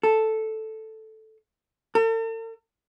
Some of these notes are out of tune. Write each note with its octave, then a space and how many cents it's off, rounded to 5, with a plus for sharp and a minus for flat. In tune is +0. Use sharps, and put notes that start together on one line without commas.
A4 +0
A4 +45